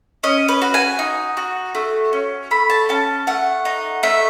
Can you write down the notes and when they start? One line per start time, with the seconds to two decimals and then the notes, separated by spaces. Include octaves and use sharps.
0.23 C#4 D#5
0.48 B4
0.62 F#4
0.74 G#5
0.99 D#4
1.37 F#4
1.75 A3
2.13 C#4
2.51 A3 B5
2.70 A5
2.89 C#4 A5
3.27 A3 F#5
3.65 D#4
4.03 A3 E5